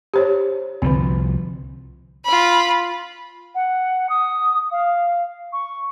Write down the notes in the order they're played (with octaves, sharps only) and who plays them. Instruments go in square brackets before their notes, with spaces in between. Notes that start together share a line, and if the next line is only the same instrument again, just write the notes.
[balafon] G4 C5 C#5
[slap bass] C2 F3 [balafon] D3 C4
[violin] F4 B5
[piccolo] F#5
D#6
F5
C#6